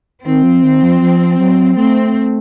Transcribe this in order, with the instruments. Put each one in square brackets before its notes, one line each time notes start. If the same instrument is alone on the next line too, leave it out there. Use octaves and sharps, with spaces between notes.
[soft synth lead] D#3 [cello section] C4
[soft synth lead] F3
D#3
F3
F3
F#3
[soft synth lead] A3 [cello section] C4